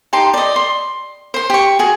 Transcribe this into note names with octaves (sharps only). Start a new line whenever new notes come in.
D#4 G4 A5 C6
D5 D#5
C6
C5 C6
G4 C#6
F#4 G#4